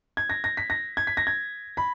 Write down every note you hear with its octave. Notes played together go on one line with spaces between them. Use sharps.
G#6
A#6
A#6
B6
A#6
G#6
B6
A#6
G#6
B5